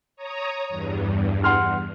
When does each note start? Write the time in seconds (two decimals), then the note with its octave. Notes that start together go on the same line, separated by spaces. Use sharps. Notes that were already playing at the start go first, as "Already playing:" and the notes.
0.16 C#5 A#5 D#6
0.69 E2 G2
1.44 F#5 C6 F6